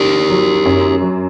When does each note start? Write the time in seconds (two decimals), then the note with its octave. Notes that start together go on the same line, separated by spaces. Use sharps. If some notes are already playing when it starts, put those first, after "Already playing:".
Already playing: D4 G4 A#4
0.30 F#3
0.66 F#2
1.02 F#3